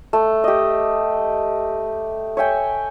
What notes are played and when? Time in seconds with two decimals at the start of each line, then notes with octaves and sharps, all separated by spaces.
0.13 A3
0.44 G4 D#5
2.37 C#5 E5 G5 G#5